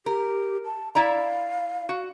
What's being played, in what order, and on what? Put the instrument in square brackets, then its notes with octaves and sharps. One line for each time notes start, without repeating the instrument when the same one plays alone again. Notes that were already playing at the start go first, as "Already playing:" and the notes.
[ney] G4 [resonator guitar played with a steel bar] A#4
[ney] A5
[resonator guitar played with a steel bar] E4 D5 A#5 [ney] F5
[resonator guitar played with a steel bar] F#4